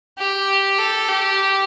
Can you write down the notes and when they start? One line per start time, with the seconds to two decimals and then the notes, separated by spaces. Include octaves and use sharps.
0.18 G4
0.78 A4
1.08 G4